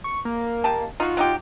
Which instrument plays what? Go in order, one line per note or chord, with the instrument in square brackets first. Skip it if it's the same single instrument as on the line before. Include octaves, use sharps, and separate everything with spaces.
[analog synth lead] C#6
A#3
[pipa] G4 D#5 A5
[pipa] D#4 F#4 [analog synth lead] F4
[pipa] F#3 D#4 G4